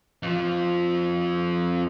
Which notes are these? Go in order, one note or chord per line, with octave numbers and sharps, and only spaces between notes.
F2 F3